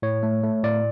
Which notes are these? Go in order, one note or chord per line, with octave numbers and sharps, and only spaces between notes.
A2 C#5
A3
A3
A2 D5